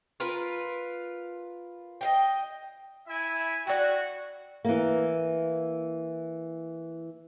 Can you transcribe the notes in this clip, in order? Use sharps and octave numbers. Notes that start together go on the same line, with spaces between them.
F4 A#4 B4
D#5 F5 G5
E4 E5 G#5
F#4 D5 G5
E3 A#3